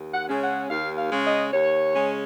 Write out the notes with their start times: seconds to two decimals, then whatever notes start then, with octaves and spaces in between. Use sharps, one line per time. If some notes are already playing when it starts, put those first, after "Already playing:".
Already playing: D#2
0.13 F#5
0.28 C#3 G#3 C#4
0.42 F#5
0.69 D#2 F5
0.97 F5
1.11 C#3 G#3 C#4
1.25 D#5
1.52 D#2 C#5
1.94 C#3 G#3 C#4